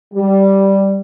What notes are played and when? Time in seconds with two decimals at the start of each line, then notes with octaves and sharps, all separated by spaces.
0.14 G3